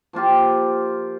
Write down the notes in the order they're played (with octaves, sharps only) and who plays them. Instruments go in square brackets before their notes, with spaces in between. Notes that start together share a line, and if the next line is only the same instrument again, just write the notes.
[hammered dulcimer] F3 A#3 F4 G4